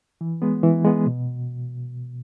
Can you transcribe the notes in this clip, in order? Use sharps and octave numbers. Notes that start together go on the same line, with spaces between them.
E3
G#3 B3
E3
G#3 B3
B2